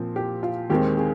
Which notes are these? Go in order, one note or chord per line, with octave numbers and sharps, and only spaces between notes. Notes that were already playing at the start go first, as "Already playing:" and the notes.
Already playing: A#2 F3 C4
G4
F4
D#2 D#3 G#3 C4 G4
G#4